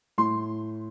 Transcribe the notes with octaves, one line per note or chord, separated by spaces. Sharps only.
A2 C6